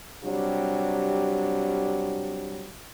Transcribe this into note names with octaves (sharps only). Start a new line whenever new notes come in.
C3 F#3 G3 D4